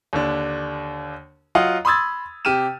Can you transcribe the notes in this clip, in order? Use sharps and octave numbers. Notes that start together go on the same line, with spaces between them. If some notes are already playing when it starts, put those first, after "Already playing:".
D#2 D3 D4
F#3 F4 D#5 F5 F#5
B5 C6 D#6 E6 G#6 A6
C3 G4 F6 D#7 E7